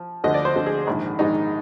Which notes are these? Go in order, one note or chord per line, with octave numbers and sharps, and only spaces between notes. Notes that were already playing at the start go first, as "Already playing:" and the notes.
Already playing: F3
D2 D3 F3 D#5
D5
C5
D2 D3 F3
G#4
A#1 G#2 D#3
A#1 G#2 D#3 D#4